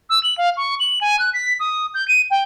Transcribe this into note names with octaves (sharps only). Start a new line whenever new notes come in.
E6
F#7
F5
C#6
F#7
G#5
F#6
B6
D#6
G6
D#7
G5